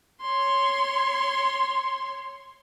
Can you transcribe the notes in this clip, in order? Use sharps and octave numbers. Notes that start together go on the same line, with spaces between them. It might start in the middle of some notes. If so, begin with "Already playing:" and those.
C#5 C6